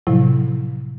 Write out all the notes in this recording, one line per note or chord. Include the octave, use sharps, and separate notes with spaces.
A2 C3 F3 F#3 E4